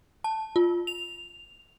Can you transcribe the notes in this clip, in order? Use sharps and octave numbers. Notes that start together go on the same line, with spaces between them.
A5
F4
F7